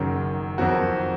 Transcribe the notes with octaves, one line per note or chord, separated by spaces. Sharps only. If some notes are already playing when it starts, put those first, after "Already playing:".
Already playing: F#1 F#2 D#3 F#3
F2 D#3 F#3 C4 F#4